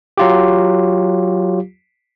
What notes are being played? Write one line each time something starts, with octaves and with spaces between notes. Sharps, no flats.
F#3 F4 G4